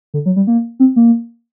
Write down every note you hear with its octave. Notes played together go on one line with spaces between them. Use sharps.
D3
F#3
G3
A#3
C4
A#3